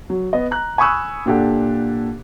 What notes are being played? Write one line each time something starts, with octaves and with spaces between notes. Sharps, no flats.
F#3
B3 D#5
A#5 F#6
G#5 B5 C#6 D#6 E6 F#6
A#2 D4 G4 A4 F#5